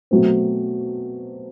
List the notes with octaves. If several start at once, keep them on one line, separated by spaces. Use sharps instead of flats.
B2 F#3 A3 C4